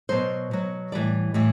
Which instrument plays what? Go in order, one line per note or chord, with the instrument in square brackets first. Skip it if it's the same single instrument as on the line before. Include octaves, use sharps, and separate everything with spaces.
[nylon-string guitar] B2 F#3 C5
B2 F#3
A2 E3 G3 D5
A2 E3 G3